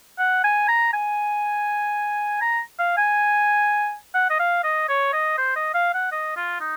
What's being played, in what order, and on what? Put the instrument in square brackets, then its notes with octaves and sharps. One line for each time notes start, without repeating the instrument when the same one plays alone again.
[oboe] F#5
G#5
A#5
G#5
A#5
F5
G#5
F#5
D#5
F5
D#5
C#5
D#5
C5
D#5
F5
F#5
D#5
F4
D#4